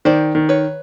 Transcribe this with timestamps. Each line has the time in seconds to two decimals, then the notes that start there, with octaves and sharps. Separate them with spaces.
0.05 D#3 C5 D5
0.35 D#3
0.49 B4 C#5